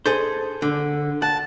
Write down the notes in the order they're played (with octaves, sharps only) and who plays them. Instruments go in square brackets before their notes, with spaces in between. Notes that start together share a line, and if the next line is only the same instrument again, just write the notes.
[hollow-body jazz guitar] G#4 A4 C5
D3
[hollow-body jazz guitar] F#5 [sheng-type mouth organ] A5